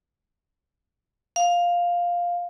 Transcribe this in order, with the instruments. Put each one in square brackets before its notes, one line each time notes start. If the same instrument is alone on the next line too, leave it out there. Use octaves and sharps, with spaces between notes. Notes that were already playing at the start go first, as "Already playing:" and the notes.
[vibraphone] F5